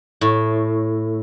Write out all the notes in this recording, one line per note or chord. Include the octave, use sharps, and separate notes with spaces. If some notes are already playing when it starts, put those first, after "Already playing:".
A2